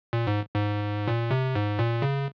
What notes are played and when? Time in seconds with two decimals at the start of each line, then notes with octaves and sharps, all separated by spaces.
0.13 A#2
0.27 G#2
0.55 G#2
1.08 A#2
1.31 C3
1.55 G#2
1.79 A#2
2.02 C#3